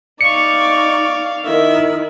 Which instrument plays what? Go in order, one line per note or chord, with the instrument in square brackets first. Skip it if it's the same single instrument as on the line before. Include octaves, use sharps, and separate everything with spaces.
[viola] D#4 C#6 [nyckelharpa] D5 F5 [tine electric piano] C#7
[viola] D#3 E4 [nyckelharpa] E5